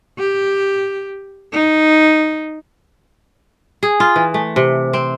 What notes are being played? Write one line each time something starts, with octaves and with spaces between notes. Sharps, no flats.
G4
D#4
G#4
F4
E3
A3
C3
C4